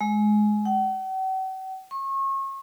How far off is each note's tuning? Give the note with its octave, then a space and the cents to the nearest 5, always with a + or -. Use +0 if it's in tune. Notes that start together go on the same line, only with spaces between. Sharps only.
G#3 +20
F#5 +45
C#6 -35